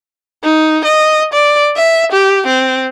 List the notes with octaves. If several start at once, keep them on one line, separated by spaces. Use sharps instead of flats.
D#4
D#5
D5
E5
G4
C4